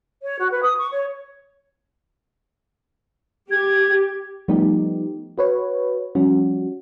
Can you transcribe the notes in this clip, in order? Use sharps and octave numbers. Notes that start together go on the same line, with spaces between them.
C#5
F#4
B4
D#6
C#6
C#5
G4 G#6
F3 G3 A3 B3 D#4 G4
F#4 B4 C#5
F3 G3 C#4 F#4